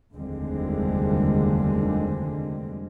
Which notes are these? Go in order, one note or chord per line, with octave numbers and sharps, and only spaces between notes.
F1 D#2 D3 G3 G#3 C4